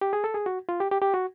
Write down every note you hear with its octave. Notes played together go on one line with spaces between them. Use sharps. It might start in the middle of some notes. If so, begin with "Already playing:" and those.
G4
G#4
A4
G#4
F#4
F4
G4
G4
G4
F#4